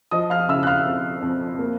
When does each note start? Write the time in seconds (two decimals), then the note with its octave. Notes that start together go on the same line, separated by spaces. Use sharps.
0.11 F3 D#5 D#6
0.30 F5 F6
0.48 C#3 E5 E6
0.63 F#6
0.67 F5 F6
0.86 F2
1.22 F2
1.59 A#3